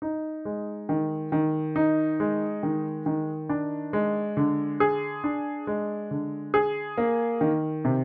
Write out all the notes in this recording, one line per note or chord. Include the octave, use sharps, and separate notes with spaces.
D#4
G#3
D#3
D#3
D#4
G#3
D#3
D#3
D4
G#3
D3
G#4
D4
G#3
D3
G#4
A#3
D#3
C3